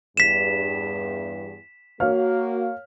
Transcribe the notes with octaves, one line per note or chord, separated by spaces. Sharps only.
E2 G2 B6 E7
A#3 F#4 C#5 F5 F6